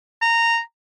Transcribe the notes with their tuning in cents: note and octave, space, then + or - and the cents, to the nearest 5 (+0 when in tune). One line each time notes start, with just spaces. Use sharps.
A#5 -15